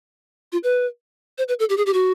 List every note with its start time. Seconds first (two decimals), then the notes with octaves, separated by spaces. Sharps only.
0.52 F4
0.63 B4
1.38 C5
1.48 B4
1.59 A4
1.69 G4
1.77 G#4
1.86 G4
1.94 F#4